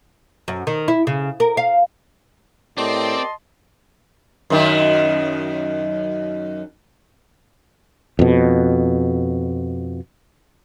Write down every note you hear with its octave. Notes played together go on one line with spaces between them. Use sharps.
F#2
D#3
E4
C#3
A#4
F5
A2 C4 G4 A#4 D5 D#5 A5 C6
F#2 D#3
F2 B2